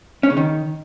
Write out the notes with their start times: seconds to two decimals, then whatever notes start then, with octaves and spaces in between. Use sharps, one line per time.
0.23 C#4
0.30 C#3
0.37 D#3